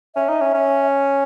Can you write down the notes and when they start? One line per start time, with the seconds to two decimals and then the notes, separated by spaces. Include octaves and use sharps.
0.15 C#4 E5
0.28 D#4
0.41 C#4
0.54 C#4